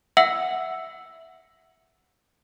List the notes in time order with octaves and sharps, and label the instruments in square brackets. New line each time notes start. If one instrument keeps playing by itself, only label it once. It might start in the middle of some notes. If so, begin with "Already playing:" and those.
[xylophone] E5 F#5 E6 C#7 F#7